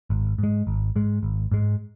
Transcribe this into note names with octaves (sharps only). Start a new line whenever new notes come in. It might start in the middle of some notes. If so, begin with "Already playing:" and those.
G#1
G#2 G#3
G#1
G#2 G#3
G#1
G#2 G#3